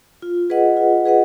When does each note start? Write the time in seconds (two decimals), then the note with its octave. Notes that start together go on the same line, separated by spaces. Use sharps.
0.22 F4
0.50 G#4 B4 D#5 F#5
0.77 F4
1.05 G#4 B4 D#5 F#5